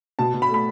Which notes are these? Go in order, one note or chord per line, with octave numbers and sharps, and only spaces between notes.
B2 A5
B2
B5
A3
B5